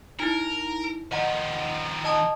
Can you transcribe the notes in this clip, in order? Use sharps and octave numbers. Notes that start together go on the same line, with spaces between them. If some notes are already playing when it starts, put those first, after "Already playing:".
D#4 E4 A#4
D#3 F3 D#5 F#5 A#5
D#5 A5 D#6